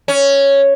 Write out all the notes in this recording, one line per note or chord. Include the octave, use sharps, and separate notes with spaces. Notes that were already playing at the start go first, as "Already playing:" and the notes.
C#4